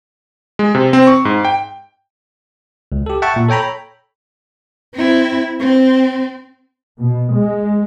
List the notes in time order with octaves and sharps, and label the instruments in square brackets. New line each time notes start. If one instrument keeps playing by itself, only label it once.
[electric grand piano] G#3
C3
C4
C#6
G#2
G5
[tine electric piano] C#2
G4 A4
E5 F#5 G5 A5 C#6
A#2
A4 C#5 G5 A#5 B5
[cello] C4 E4
C4
[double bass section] B2
G#3